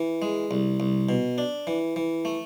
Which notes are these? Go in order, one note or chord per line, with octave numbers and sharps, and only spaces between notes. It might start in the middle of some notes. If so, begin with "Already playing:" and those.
Already playing: E3
G#3
C2
C2
B2
D4
E3
E3
A3